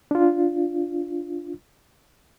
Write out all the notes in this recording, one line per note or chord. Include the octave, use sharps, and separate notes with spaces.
D4 F4